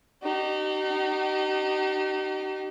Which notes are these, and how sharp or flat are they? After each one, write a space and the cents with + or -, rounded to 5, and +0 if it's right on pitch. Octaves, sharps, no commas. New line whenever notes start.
D#4 -25 G4 -45